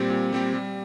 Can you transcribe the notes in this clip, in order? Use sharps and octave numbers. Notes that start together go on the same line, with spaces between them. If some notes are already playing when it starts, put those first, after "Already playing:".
Already playing: A#2 G3 C4 G4
A#2
G3 C4 G4
G3